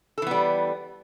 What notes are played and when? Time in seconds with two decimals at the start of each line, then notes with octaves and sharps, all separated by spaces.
0.18 A4
0.22 E3
0.27 B3
0.31 G3